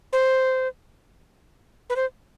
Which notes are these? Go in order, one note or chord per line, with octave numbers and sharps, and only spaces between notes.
C5
B4
C5